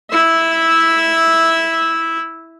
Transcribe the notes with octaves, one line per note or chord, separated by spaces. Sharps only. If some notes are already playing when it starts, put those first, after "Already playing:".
E4 E5